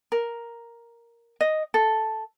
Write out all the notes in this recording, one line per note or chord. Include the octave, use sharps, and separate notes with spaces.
A#4
D#5
A4